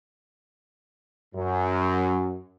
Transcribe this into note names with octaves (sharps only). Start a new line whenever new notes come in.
F#2